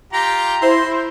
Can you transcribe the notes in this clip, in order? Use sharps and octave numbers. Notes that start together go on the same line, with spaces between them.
F4 G4 G5 A#5
E4 C5 C6